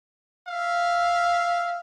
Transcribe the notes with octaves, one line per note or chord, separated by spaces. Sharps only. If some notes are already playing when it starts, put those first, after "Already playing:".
E5 F5